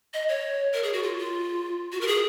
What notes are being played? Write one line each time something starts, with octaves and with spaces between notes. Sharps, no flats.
D#5
C#5
A#4
G#4
F#4
F4
F4
F#4
A#4
G#4